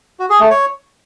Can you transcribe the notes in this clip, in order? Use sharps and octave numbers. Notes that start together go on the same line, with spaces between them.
F#4
G#4
A3
C#5